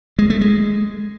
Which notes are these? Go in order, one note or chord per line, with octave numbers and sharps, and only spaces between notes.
G#3
A3
G#3